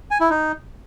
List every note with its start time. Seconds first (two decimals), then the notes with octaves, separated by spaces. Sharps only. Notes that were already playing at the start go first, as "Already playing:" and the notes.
0.11 G#5
0.21 E4
0.30 D#4